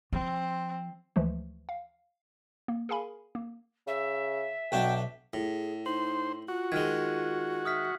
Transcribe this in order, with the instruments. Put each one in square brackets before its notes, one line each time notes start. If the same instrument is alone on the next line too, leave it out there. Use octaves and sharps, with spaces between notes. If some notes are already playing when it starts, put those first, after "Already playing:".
[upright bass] F3 [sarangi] C4
[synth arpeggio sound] D2 E3 F3 G#3 A3
F5
A#3
G#4 A#4 F5 G#5 B5
A#3
[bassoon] C#3 [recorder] E5
[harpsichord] B1 D4 [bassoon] F#4 [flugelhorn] G5
[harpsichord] A2 [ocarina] G#4
[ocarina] D#4 [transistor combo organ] C5 [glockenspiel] F#7
[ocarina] F4 [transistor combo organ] F#4
[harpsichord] D#3 G#3 [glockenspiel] F6 G#6
[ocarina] E5 [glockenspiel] D#6 F6 B6